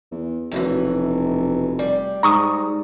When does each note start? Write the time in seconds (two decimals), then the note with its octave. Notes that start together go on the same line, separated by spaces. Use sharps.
0.11 E2
0.52 F1 F#2 B2 E3
1.79 G3
2.23 G#2 A#5 C#6 D#6